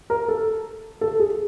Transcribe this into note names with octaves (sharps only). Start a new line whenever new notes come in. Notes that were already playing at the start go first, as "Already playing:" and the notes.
A#4
A4
A4
G#4